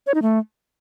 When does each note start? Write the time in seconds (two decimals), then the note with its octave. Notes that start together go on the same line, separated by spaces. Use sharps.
0.07 C#5
0.14 D#4
0.22 A3